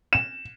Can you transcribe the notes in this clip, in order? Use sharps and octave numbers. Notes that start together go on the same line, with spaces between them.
E7